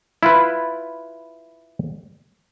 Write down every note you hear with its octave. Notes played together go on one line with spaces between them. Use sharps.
E4 F4 B4